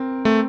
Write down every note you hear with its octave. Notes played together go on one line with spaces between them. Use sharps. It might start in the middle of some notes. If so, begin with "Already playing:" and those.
Already playing: C4 A#4
A3 C4